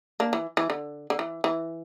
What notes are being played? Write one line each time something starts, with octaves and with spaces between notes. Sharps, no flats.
A#3 D4
E3
E3
D3
D3
E3
E3